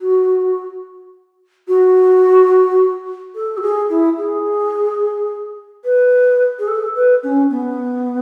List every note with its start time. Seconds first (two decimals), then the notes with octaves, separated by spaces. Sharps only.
0.01 F#4
1.68 F#4
3.35 A4
3.57 F#4
3.62 G#4
3.89 E4
4.18 G#4
5.84 B4
6.59 G#4
6.68 A4
6.95 B4
7.23 C#4
7.50 B3